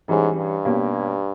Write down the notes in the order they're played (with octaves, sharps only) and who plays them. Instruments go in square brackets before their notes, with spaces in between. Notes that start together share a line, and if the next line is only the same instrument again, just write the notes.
[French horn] G#2 [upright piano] E3 G3 C#4 G#4
[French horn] G2
[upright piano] B2 A#3 C#4 G4